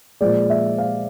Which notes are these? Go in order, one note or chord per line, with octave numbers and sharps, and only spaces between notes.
A#2 F3 G#3 D5
E5
F5